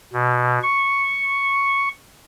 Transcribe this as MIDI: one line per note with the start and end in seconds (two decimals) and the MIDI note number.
0.13 0.59 47
0.62 1.88 85